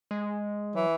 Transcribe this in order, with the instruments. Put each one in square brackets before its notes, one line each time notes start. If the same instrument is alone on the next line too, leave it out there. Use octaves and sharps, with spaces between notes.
[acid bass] G#3
[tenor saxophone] E3 [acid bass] F#3